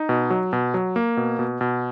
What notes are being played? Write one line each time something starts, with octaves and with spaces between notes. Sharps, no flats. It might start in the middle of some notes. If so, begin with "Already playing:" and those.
Already playing: D#4
B2
F#3
B2
F#3
A#3
B2
B2
B2